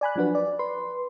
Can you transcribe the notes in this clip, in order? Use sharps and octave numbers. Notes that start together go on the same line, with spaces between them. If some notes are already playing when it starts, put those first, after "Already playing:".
D5 G#5 B5 F#6
F3 F#3 D4 F#4 B4
D5
B4 C6